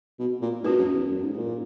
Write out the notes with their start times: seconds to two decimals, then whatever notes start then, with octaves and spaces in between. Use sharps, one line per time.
0.20 B2
0.42 A#2
0.63 G#2 C#4 F#4 B4
0.79 F#2
0.94 E2
1.11 F#2
1.23 G#2
1.33 G#2
1.38 A#2